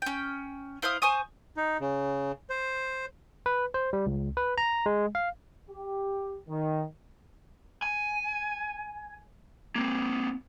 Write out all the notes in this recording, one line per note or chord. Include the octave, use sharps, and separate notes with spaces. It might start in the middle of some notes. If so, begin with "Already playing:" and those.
C#4 G5
E4 C5 F5 D#6
C5 G#5 C#6 D#6
D#4
C#3
C5
B4
C5
G3
C#2
B4
A#5
G#3
F5
G4
D#3
G#5
A#3 C4